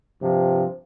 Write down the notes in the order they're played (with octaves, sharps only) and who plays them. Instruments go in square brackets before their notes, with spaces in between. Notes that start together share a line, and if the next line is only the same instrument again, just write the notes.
[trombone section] G2 C3 F3